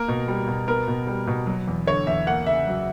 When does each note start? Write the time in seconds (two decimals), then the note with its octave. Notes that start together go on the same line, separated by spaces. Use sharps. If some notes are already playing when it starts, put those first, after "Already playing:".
Already playing: A#3 A#4
0.08 B2
0.28 G3
0.47 B2
0.68 B3 A#4
0.88 B2
1.07 G3
1.27 B2
1.47 F#3
1.67 E2
1.87 D3 C#5
2.07 E2 E5
2.27 A#3 F#5
2.46 C#3 E5
2.67 F#3